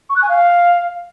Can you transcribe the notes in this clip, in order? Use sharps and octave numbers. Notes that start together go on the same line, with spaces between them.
C#6
F#6
G#5
F5